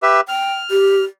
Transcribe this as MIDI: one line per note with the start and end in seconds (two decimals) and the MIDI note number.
0.03 0.21 67
0.03 0.21 71
0.03 0.21 76
0.29 0.55 79
0.29 1.05 89
0.70 1.01 67